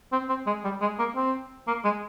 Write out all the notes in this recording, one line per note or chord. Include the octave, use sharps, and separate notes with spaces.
C4
C4
G#3
G3
G#3
A#3
C4
A#3
G#3